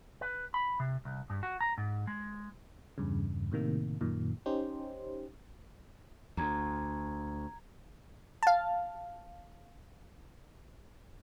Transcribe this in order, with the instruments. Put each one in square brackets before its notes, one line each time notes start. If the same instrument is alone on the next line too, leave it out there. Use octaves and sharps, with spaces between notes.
[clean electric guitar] B4
B5
C3
C2
G2
F#4
A#5
G#2
G#3
[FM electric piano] E2 G2 C#3
A2 C3 D#3 A#3
F#2 A#2 D#3
C#4 D#4 G4 C5
[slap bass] D2 [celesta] A#5 G#6
[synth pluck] F5 A5